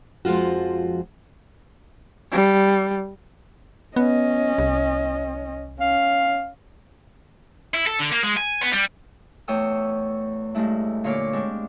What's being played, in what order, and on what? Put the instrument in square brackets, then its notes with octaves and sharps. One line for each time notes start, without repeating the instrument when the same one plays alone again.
[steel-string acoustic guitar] F2 F3 G#3 F4 F#4
[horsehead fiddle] G3
[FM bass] B3 [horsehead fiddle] C#4 D#5
[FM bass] C2
[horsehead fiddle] C#4 [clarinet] F5
[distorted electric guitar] E4
A4
D3
A#3
G#3
G#5
B3
G3
[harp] E2 A3 C#5 G5 D#6 E6
G2 G#3 A3 E4
A#2 D3 C#5 F5 D6
G#3 C4 D4